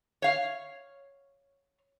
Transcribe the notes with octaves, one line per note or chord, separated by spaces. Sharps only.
C#5 F5